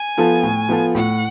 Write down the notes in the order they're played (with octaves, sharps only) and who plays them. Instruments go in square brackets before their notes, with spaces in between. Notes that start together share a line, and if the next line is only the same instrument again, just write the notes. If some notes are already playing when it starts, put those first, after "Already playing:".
Already playing: [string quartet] G#5
[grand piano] F3 B3 F4 A4
A2
F3 B3 F4 A4
[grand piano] A2 [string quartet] F#5